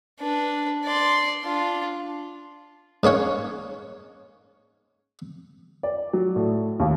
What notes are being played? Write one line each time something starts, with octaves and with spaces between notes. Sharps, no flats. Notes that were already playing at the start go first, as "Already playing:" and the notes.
D4 B4
D5 C6
D4 F4
G#2 A#3 C#4 C#5 F#5
D5
F#3
A2
D#2